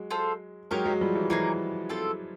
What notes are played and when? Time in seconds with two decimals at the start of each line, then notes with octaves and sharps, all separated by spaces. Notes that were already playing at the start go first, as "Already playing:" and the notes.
Already playing: F#3 G#3
0.11 F4 A4 C5
0.71 F#3 G#3 D#4 G4 A#4 C#5
0.86 F#3 G#3
1.01 F3 G3
1.15 E3 F#3
1.30 E3 F#3 A#3 D#4 G#4
1.89 C4 F4 A4